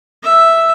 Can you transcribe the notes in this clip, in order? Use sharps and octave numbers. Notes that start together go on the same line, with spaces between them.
E5